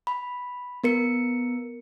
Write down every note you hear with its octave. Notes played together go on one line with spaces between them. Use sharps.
B5
B3 A#4 C#7